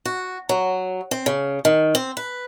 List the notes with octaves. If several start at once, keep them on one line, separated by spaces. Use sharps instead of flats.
F#4
F#3
C4
C#3
D#3
C4
B4